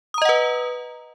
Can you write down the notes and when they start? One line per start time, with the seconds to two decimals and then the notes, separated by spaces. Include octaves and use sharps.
0.14 D#6
0.18 A#5
0.22 D#5
0.25 F#5
0.29 B4